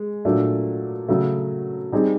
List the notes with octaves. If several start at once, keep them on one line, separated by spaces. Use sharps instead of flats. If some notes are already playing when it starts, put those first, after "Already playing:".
Already playing: G#3
A#2 F#3 A3 D4
C#3 F#3 A3
G3 C4 D#4 G#4